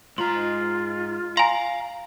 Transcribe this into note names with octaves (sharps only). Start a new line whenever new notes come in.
G#2 F4 A#5 C6
F5 G#5 A#5 C6